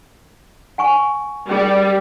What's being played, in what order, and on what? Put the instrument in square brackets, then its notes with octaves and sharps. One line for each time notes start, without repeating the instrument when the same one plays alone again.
[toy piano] F#5 G#5 C#6
[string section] G3 [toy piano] C#4 G#4 A#4